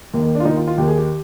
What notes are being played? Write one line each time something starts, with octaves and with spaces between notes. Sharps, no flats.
D#2 D#3 A#3
A#3
D4
F4
D#2 D#3 D#4
F4
F4
D#2 D#3 G4
G#4
G4